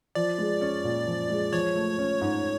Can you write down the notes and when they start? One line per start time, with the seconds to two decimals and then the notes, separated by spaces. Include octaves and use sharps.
0.15 F3 D5
0.38 G#3
0.61 C#4
0.84 A#2
1.07 F3
1.30 G#3
1.52 F3 C#5
1.76 A3
1.99 C#4
2.22 G#2